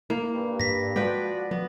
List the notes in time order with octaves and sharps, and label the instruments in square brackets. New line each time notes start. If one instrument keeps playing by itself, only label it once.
[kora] A#3 [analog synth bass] E4
[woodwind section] G2
[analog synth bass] G#2 [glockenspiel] A#6 B6
[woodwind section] F3 F#4 D5 [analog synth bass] G#3 [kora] B4 G5
[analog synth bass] F#3 [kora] B3